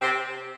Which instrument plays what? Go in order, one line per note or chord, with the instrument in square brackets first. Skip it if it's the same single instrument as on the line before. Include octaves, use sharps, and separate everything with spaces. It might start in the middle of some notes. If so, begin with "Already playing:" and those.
[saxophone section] C3 C4